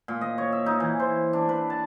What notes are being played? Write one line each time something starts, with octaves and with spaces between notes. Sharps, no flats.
A#2
D#5
C#5
E5
D#4
E3
C5
D4
B4
A5